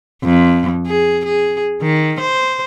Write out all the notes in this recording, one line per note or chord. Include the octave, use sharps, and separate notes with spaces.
F2
G#4
G#4
D#3
C5